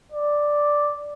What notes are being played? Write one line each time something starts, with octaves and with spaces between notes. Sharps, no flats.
D5